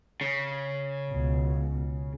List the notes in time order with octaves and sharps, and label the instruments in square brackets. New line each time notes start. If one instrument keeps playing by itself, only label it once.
[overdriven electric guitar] C#3
[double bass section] C#2 B2